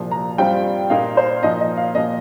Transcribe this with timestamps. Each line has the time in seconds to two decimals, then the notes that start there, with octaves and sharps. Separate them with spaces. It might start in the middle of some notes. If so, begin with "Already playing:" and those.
Already playing: C2 A#2 F3
0.11 A#5
0.38 G2 G3 C4 F4 G5
0.90 A#2 A#3 D#4 F5
1.17 C5
1.43 A#2 F3 D#4 D#5
1.60 D#5
1.77 F5
1.95 A#2 F3 A#3 D#5